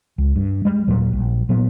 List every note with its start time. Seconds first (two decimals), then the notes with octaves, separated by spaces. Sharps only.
0.18 C#2
0.36 G2
0.65 G3 G#3
0.87 D#2 A#2 F#3 G3
1.13 A#1
1.49 A#2 F#3 B3